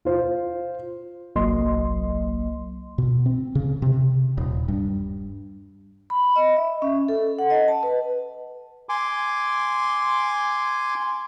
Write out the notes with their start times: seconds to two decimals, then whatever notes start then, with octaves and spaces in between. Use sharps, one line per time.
0.05 F4 C5
1.36 G1 C2 F#3 A#3 D#5 C6
2.98 B2
3.26 C4
3.55 C#3
3.82 C3
4.38 D#1
4.68 G2
6.10 B5
6.36 D#5
6.57 E5
6.82 C#4
7.09 A4
7.39 F#5
7.50 D#5
7.68 A5
7.83 B4
8.89 G#5 C6 D6